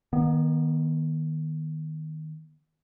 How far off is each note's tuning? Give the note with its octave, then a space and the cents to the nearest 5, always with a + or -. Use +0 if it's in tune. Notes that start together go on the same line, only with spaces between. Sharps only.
D#3 +0 B3 -35